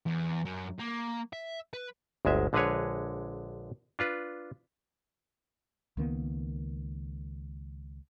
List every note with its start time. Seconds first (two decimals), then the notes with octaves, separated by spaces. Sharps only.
0.06 E2
0.45 F#2
0.79 A#3
1.33 E5
1.73 B4
2.25 G1 D2 G#3 E5
2.53 A#1 D3 G#3 G#4 B4 C#5
3.99 D4 F4 B4
5.97 C#2 D#3 A#3 B3